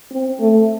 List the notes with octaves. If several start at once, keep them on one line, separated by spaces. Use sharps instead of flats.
C4
A3